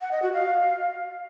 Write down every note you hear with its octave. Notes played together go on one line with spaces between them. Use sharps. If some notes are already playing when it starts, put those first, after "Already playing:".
F#5
D#5
F#4
F5